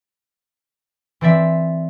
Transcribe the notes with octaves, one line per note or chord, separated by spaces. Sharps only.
E3 C4 D5 E5